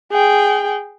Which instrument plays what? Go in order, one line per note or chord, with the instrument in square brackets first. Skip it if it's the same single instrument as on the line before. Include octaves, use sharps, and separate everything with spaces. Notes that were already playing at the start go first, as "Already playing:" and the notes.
[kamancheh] G#4 G5